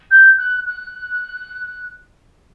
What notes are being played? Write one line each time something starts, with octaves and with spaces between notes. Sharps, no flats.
G6
F#6
F#6